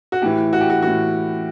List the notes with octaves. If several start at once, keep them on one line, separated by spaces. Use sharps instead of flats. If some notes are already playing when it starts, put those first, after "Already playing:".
F#4
A2 E3 G4
F#4
G4
F#4
A2 E3 F#4